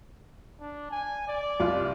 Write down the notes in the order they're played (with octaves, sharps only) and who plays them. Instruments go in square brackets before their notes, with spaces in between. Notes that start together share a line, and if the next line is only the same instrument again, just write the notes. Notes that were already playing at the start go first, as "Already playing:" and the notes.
[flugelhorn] D4
G#5
D5
[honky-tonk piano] C2 F4